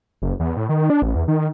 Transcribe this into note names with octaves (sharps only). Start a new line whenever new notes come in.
F#1
E2
A2
D#3
D4
A1
E2
D#3